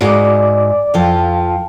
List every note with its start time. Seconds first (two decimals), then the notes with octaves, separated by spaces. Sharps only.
0.01 G#2 F#4 D5 D6
0.94 F2 F3 F5 G5 A5